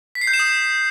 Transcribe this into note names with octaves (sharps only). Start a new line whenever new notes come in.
B6
C7
G6
E7
D#6